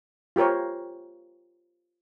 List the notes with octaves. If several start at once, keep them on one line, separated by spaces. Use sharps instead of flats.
F4 G4 A#4 C5 C#5